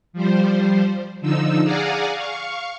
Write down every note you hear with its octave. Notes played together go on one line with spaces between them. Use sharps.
F3 G3 C5
D3 F3 D#4 E6
G#4 D5 F5 F#5 G#5 A#5
F5 C#6